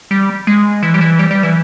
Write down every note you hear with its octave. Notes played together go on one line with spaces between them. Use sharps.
G3
G#3
E3
G3
E3
G3
G3
E3